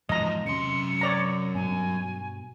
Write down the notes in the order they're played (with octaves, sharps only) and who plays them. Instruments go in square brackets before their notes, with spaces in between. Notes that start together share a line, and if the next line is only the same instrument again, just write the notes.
[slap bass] E2 G#2 B2 [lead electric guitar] E3 F3 [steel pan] D#5 A#5
[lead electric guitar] F#2 C6 [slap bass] C3 C#4 [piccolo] C#7
[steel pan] C#5 D5 A#5
[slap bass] G2 B2 [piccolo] G#5